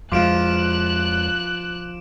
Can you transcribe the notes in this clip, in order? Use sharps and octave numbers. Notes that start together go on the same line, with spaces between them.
F2 F3 G#3 D6 F#6 D7 E7